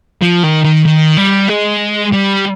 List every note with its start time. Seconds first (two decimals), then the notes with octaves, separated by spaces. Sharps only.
0.22 F3
0.44 D#3
0.64 D#3
0.86 D#3
1.17 G3
1.48 G#3
2.12 G3